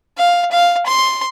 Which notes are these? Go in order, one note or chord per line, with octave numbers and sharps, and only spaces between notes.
F5
F5
C6